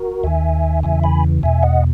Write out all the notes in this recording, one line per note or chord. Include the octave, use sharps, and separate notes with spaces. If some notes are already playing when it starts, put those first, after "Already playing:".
Already playing: F#4 A#4
D#2 D#3 E5 G#5
E2 C#3 E3 E5 G#5
G#5 B5
E2 B2 E5 G#5
D#5 F#5